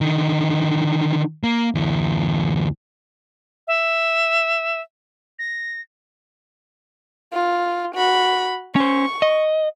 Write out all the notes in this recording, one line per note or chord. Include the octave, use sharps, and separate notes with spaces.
D3 D#3
A#3
D2 E3
E5
A#6
F4
F#4 B5
C#4 C5 C#6
D#5